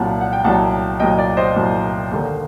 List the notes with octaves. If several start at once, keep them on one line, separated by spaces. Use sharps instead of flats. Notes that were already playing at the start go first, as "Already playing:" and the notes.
Already playing: C2 A#2 F#3 F#5 A5
F#5
G5
C2 A#2 F#3 F#5 A5
C2 A#2 F#3 D#5 G5
D5
C5 D#5
C2 A#2 F#3
D#2 D3 G3 A#3